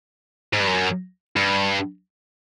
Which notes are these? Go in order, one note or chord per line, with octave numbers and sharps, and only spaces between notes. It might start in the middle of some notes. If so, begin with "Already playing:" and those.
G#2
G2
F#2
G2